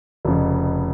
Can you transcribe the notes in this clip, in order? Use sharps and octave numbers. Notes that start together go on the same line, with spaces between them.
F1 F2 C#3